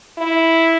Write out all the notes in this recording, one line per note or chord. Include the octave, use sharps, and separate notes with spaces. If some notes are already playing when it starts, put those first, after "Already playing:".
E4